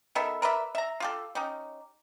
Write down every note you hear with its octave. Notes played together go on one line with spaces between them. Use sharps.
D#3 B3 A4 E5
A#4 B4 D5 E5
E5 A#5
F4 G4 A4
C#4 D#4 G4